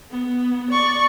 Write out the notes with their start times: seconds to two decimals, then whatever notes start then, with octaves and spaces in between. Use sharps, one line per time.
0.11 B3
0.72 D5 C#6